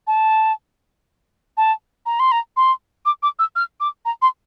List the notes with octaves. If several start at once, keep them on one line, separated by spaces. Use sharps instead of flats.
A5
A5
A#5
C6
A#5
C6
D6
D6
E6
F6
D6
A#5
C6